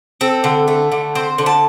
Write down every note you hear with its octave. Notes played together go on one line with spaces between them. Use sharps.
C4 A4
D3
A3
D3
C4 C5
D3
A5